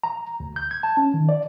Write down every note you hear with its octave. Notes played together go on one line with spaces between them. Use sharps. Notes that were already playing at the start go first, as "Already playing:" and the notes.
A#5
D2
G6
G#6
A5
C#4
D#3
D5